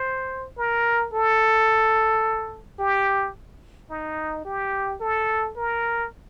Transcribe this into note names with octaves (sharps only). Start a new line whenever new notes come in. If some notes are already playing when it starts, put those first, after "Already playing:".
Already playing: C5
A#4
A4
G4
D#4
G4
A4
A#4